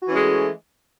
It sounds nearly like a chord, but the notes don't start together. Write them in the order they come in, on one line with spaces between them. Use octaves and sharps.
F#4 E3 C#4 G#3 A3